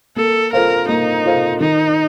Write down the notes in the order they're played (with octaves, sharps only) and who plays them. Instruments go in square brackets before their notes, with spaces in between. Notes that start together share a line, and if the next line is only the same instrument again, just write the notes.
[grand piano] A#3 [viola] A4
[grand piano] F4 A4 C5 F5 [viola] A#4
[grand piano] A#3 [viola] D#4
[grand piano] F4 A4 C5 F5
[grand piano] D#3 [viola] D#4